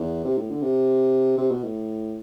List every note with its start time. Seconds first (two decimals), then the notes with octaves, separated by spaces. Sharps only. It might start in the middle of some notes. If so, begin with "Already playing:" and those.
Already playing: E2
0.25 C3
0.38 A2
0.50 D3
0.62 C3
1.38 C3
1.51 B2
1.63 A2